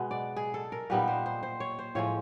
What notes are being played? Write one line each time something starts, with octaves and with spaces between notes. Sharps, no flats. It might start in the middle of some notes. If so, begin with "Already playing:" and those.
Already playing: B2 G#3 B3
D5
G#4
A4
A#4
A#2 G3 B3 D#4 B4
C5
C5
C5
C#5
C5
A2 F3 G#3 C#5